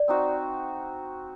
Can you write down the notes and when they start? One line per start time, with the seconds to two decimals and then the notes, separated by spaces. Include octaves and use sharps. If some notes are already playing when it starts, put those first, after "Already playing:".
Already playing: D5
0.08 C4 D#4 F#4